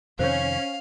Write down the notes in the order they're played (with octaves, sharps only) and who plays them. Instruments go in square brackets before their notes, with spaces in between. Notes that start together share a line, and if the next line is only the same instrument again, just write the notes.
[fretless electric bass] F2 C3 D#3 [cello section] C#4 [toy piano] C5 C#5 [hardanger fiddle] F5